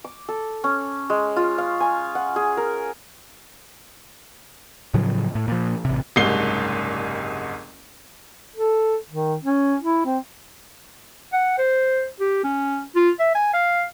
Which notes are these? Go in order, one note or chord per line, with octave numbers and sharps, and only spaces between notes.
D6
A4
C#4
G#3
F4
F5
G#5
F#5
G#4
A#4
A2 C#3 F3 F#3
A2
A#2 F3
A1 C3
F#1 C2 G#2 C7 G7
A4
D#3
C#4
E4
C4
F#5
C5
G4
C#4
F4
E5
G#5
F5